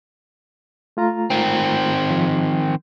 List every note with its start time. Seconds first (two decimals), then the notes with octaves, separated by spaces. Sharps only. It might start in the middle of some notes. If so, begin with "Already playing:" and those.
0.97 A3 F4 A#5
1.30 D#3 C4
2.11 F3